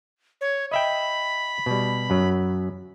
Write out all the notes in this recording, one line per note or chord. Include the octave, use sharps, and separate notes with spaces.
C#5
D#5 E5 G5 B5
B2 G3
F#2 F#3